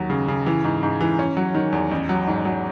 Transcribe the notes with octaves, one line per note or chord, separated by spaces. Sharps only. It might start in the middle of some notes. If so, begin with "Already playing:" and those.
Already playing: D#2 F#3
C#3
C#3
E3
G#2
G#2
E3
C#4
F#3
D#3
E2
A1
F#3
G#2
F#3